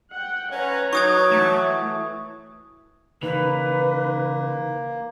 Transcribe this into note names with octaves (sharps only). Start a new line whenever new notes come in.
F#5 G5
C#4 B4 C#5 A#5
F#3 D#4 C#6 D#6 G#6
E3 A3
C#3 E3 A#3 D#4 B4